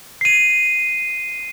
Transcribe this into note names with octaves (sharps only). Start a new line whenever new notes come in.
C7 D#7